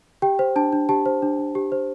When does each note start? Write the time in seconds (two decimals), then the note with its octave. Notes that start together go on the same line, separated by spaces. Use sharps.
0.22 G4 G5
0.39 C5
0.56 D4 A5
0.73 D4
0.89 G4 A5
1.06 C5
1.22 D4
1.39 D4
1.55 G4
1.72 C5